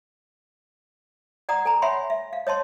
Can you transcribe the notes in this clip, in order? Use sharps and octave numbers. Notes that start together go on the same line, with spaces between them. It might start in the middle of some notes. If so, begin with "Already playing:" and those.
D5 F#5 A#5 D#6
A4 G#5 A#5
C#5 E5 F#5 G#5 B5 C6
E5
F5
C#5 D#5 A5 C6